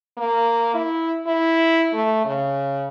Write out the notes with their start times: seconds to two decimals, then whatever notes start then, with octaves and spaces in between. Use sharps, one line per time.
0.17 A#3
0.74 E4
1.26 E4
1.93 A3
2.25 C#3